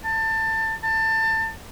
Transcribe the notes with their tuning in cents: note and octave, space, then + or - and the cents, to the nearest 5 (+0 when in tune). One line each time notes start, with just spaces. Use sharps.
A5 +20
A5 +25